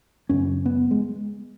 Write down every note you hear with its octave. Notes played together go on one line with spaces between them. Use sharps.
F#2 C#3 C#4
B3
G#3